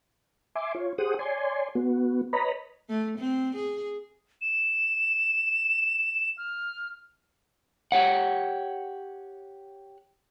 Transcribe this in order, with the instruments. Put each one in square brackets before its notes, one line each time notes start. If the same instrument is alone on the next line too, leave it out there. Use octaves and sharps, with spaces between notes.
[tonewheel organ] E5 G#5 C6 D6
F4 C#5
G4 G#4 C5 F#5 D#6
C#5 D5 G#5 C6
B3 F#4
B4 C#5 D#5 A#5 B5
[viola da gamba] A3
C4
G#4
[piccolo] E7
F6
[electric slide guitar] G4 C#5 F#5